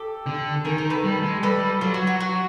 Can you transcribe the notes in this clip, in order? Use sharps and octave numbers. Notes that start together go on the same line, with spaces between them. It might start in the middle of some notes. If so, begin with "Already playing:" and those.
Already playing: G4 A4
D3
D#3 G#4 A#4
A#4 C5
A4 B4
G3
G#3
G3 A4 B4
F#3 F4
F#4
F#4
F#4